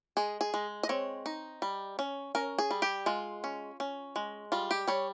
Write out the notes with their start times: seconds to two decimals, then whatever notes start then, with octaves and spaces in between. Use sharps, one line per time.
0.17 G#3 G#4
0.41 G#4
0.54 G#3
0.83 D#5
0.89 C4 C#5
1.26 D#4
1.62 G3
1.99 C#4
2.35 C#4 A#4
2.59 G#4
2.71 G3
2.82 G4
3.06 G#3 F4
3.44 C#4
3.80 C#4
4.16 G#3
4.52 G3 F4
4.71 G4
4.88 G3 C#5